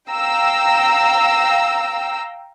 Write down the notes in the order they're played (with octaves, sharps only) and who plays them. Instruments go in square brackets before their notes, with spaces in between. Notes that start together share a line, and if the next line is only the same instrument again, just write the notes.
[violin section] F5 G5 A#5 E6